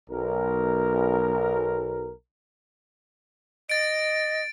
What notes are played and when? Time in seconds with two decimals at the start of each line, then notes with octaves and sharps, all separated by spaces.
0.10 B1 A#4
3.69 D#5 A6 D7